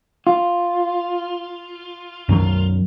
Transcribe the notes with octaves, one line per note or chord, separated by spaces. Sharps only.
F4
F#2 D#3 F#3